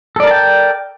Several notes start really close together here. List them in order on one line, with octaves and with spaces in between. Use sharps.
A4 D5 A#4 A5 G5